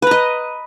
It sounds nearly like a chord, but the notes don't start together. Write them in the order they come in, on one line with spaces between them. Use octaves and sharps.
B4 A#5 D#5